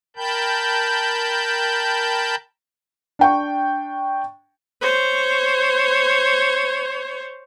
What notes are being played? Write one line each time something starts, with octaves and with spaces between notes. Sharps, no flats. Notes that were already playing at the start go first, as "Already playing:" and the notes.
A#4 G5 A5 B5 G6
D4 G5 C#6
C5 C#5